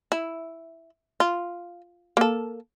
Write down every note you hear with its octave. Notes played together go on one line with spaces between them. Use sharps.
E4
F4
A#3 A4